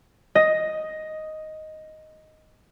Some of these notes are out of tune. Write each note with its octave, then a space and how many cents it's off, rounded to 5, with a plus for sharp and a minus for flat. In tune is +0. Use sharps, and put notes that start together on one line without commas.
D#5 +5